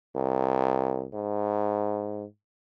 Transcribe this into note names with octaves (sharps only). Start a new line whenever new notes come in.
C2
G#2